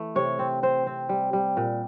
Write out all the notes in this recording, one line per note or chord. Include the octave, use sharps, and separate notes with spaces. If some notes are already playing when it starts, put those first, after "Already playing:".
Already playing: E3 A3
C3 C#5
C4
C4 C5
C4
G3
G3
A#2